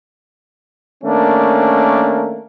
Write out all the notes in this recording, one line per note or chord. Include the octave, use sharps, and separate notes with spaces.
D#3 A3 A#3 C#4 D4